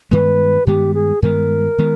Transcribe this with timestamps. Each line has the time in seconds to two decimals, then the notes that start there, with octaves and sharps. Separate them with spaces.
0.11 G2 D#3 G#3 B3 B4
0.67 G2 D#3 G#3 B3 G4
0.94 G#4
1.22 G2 D#3 G#3 B3 A#4
1.78 D#3 G#3 B3